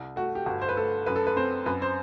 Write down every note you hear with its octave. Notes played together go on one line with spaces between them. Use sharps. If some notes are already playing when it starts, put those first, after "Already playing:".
Already playing: C2
A3 F#4
G4
G1 F#4
C5
B4
A3 A4
F#2 B4
A4
B4
C4 C5
F#2 B4
C5